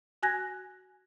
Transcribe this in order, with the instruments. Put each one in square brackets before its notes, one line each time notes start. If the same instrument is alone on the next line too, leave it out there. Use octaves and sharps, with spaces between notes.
[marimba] F#4 G#5 F#6 G#6 A#6